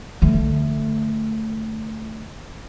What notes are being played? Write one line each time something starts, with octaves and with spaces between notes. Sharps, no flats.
D3 A3